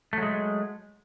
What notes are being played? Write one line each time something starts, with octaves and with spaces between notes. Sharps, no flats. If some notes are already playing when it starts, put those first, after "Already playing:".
F#3 G#3 A3